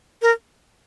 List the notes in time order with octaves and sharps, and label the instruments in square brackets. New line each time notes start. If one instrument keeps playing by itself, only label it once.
[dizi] A#4